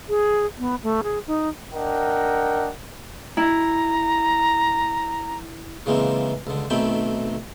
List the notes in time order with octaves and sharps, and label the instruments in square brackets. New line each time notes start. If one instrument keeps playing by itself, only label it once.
[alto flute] G#4
B3
A3
G#4
D#4
[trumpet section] D4 A#4 D#5 F#5 G5
[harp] E4 [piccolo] A#5
[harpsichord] C#3 E3 G#3 A#3 C4
C#2 D3
B1 D#3 A3 C4 G5 B5